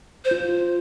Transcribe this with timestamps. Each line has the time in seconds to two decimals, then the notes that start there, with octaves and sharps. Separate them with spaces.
0.25 C5
0.31 F4